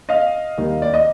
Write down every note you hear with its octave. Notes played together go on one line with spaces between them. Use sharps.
D#5 F5
D#2 D#3 G3
D5
D#5